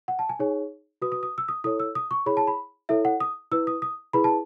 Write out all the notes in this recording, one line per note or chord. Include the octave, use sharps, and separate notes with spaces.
F#5
A5
G#5
D#4 G#4 C#5
F#4 B4 D#6
D#6
D#6
E6
D#6
E4 A4 C#5 D#6
E6
D#6
C#6
E4 G#4 C#5 B5
A5
B5
E4 A4 C#5 E5
F#5
D#6
E4 B4 E6
D#6
D#6
E4 G#4 B4 B5
A5